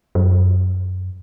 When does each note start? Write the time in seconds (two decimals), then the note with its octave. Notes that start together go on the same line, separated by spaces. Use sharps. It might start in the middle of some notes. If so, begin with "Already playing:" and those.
0.15 F#2